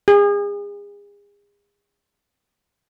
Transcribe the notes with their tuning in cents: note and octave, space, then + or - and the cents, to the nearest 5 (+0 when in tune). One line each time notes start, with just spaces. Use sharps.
G#4 -35